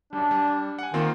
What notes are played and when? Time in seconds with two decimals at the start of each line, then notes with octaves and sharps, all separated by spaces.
0.13 F#2 G3 D4
0.31 G3
0.79 F#5 G#5
0.94 D#3 A#3 C4 F4